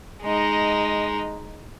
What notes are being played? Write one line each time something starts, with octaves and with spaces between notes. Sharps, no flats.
G#3 D#4